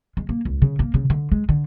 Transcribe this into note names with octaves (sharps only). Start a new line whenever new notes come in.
G#3
A#3
C#2
C#3
A#3
C#3
D3
G#3
D3